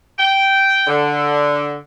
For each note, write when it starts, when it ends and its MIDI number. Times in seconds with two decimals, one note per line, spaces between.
0.19 0.87 79
0.87 1.75 50